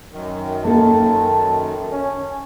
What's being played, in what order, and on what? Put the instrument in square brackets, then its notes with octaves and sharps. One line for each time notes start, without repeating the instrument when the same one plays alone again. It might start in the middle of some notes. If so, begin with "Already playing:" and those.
[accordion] F#2 D#3
[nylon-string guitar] A#3 A4 [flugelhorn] A5
[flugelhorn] C#4